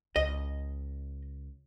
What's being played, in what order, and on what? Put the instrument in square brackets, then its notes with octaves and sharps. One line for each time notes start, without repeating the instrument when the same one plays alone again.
[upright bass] C#2 [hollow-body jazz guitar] D#5